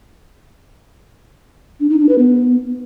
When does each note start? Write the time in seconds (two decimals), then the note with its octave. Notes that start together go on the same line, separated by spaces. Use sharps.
1.80 D4
1.90 D#4
1.99 D4
2.09 B4
2.18 B3